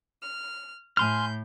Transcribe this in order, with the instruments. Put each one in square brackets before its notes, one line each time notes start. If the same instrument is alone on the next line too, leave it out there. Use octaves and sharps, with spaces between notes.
[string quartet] F6
[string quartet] A2 G6 [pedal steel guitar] G#5 C6 F6